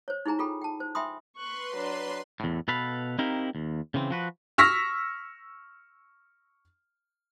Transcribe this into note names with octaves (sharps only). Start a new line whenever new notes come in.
C5 C#5
D#4 E4 G#4 G#5 A#5
F4 G#4 A4 G5 B5
G5 A5
C5
E5 G5 G#5 B5 C6 D#6
B4 C6 C#6 F#6
F#3 D4
E2 A2
B2 A4 B4 F5 B5
C4 D#4 E4 G4 A#4 F5
D#2
C#3 E3 C4
F3 F#4 B4
C#6 E6 F6 A#6 B6